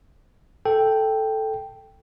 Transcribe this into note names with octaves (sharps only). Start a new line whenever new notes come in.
A4 G5